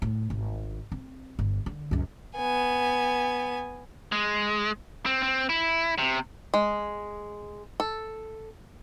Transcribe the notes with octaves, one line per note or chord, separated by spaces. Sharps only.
A2
G#1
C4
G1
D3
C#2 F#2
B3 G#5
G#3
C4
C4
E4
C3
G#3
A4